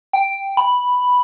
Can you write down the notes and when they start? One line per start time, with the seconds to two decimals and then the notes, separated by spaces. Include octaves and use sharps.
0.13 G5
0.57 B5